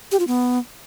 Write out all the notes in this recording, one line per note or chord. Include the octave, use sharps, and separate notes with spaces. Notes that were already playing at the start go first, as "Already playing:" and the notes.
G4
F4
B3